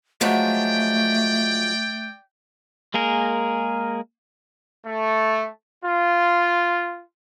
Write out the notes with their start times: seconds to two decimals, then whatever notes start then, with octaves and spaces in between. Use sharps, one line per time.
0.21 F3 F#3 G#3 A3 D5 G5
2.94 G#3 A#3 G#4 A#4
4.86 A3
5.84 F4